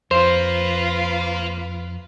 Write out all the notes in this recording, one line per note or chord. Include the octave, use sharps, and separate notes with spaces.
F2 F4 B4 C5 F5 A#5